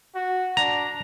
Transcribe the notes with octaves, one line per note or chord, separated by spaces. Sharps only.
F#4
D4 A#5